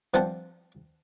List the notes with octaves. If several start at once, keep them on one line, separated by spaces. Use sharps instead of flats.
G2 F3 C4 C5 F#5 A5